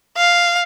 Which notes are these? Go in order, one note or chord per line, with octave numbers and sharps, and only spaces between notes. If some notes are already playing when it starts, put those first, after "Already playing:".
F5